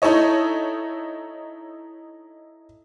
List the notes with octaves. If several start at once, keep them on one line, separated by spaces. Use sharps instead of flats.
D#4 E4 A4 C#5 D#5